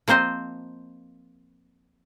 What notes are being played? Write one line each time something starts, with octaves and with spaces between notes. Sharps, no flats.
F3 A#3 C4 C5 D#5